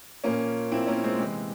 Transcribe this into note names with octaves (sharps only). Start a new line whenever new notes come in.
A#2 F3 A#3 C#4
A#2 F3 C4 E4
A#3 C#4
G#3 C4
C3 E3 G#3